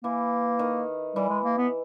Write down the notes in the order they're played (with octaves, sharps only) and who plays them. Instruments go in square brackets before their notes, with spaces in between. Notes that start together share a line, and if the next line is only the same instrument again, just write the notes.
[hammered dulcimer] E3 [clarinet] A#3
[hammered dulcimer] D#3
[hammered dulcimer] E3 [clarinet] G3
[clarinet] G#3
A#3
B3